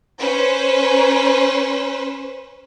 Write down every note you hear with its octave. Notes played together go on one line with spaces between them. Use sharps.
C#4 B4 C5